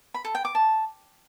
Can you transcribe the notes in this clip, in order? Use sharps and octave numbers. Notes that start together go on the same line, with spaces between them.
B5
A4
G5
D6
A5